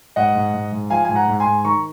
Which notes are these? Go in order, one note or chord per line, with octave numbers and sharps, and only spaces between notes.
G#2 D#5 F#5
G#2
G#2
G#2
F3 F5 G#5
G#2 G#5
F#5 A#5
G#2
G#5 C6
G#2
D#3 A#5 C#6